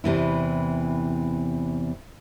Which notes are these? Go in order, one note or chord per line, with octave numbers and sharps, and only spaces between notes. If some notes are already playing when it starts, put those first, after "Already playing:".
E2 C3 E3 E4